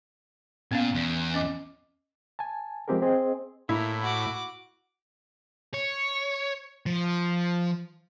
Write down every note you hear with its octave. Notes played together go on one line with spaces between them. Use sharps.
A#2 B3 C#4 F5
E2
C#4 D#5 D6
G#5 A5
F3 G#3 C4 G4 G#4 A#4
C4 G#4 C5 D#5
A2 A#3 E4
F#4 D6
C#5
F3